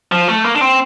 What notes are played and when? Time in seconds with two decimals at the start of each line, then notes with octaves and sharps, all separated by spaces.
0.12 F3
0.28 A3
0.44 A#3
0.55 D4
0.61 C4